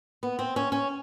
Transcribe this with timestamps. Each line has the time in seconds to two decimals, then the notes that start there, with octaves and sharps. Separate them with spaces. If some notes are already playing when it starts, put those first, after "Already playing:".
0.23 B3
0.39 C4
0.56 C#4
0.72 C#4